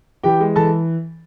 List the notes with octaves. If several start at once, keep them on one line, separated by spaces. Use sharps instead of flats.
E3 G4 G5
G#3
E3 A4 A5